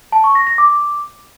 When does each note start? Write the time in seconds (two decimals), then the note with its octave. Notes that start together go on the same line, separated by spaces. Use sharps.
0.12 A5
0.24 C#6
0.35 A#6
0.47 A#6
0.58 D6